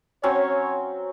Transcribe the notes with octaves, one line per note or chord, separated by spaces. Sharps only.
F#3 C4 C#4 C#5